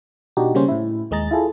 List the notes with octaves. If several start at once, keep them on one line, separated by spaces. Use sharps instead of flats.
B2 D4 D#4 F#4 G4
C#3 G3 A#3 C#4 C5
A2 E4
D#2 G#3 G#4 A#5 A6
E4 F4 G#4 A4